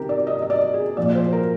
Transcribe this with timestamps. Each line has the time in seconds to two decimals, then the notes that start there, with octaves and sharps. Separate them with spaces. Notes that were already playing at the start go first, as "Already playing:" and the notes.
Already playing: C3 D#3 G4 A#4
0.09 D5
0.27 D#5
0.42 D#5
0.50 D5
0.74 G#4
0.97 A#2 F3 D5
1.15 C5
1.33 A#4